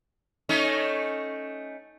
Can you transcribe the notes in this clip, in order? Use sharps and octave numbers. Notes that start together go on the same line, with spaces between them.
A3 C#4 D#4